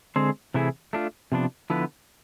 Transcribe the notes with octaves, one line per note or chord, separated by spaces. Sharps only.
D3 G#3 C4 G#4 C5
C3 E3 A3 E4 G#4
A3 D4 F4
C3 F3 B3 D4
D3 F3 B3 E4 B4